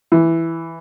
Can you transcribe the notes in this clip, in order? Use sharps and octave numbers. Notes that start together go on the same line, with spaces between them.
E3